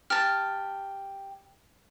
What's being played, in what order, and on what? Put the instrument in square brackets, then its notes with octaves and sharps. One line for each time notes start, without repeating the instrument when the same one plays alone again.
[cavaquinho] G4 A5 [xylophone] F6